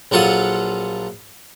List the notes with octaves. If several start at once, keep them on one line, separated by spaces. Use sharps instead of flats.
A#1 F#3 F4 A4 F#5 D#6